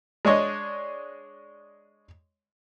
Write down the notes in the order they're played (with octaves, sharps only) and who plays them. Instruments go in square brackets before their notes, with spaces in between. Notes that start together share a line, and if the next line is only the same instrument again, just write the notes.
[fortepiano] G#3 D4 C#5 D#5